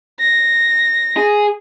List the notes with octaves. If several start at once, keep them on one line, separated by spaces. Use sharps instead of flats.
A#6
G#4